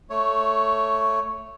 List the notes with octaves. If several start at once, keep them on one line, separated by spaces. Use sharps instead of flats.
A3 C#5